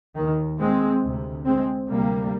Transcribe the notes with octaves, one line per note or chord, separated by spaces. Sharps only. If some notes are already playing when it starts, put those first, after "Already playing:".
D#2 D#3
G#3 C4
D2 C3
G#3 C4
D2 C3 G3 A#3